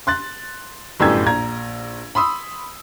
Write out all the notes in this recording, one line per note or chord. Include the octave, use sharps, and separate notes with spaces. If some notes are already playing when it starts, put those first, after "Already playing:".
C6 F#6 A6
G1 F#2 A2 G4 E6 G#6
A#1 A#5 G#6
B5 C6 D#6 E6